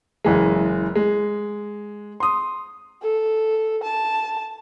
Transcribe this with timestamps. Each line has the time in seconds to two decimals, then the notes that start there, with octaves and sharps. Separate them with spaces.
0.24 F#1 E3 G#3
0.95 G#3
2.20 C6 D#6
3.02 A4
3.83 A5